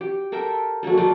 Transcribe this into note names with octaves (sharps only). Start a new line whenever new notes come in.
G4
A4 A#4 E5 G5
F#3 G#3 A#3 A4
F#3 A3 F4 D5